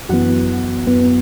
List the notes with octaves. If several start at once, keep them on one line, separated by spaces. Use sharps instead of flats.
F#2 E3 B3 F#4 F#5
F#2 E3 B3